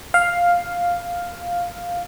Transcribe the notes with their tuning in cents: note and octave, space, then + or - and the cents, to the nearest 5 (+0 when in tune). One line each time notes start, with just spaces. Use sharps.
F5 +5